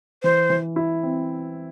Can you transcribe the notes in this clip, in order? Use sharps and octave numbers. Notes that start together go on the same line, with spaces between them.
E3 C5
E3
E4
C4